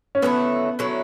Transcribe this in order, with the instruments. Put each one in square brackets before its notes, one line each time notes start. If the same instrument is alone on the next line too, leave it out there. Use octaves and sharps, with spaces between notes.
[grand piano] C#4
[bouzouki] D3 F#3 A3 E4 [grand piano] B3
[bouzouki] D3 F#3 A3 E4